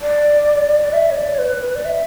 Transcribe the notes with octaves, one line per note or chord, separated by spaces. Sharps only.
D5
D5
E5
C#5
D5
C#5
B4
B4
D5
E5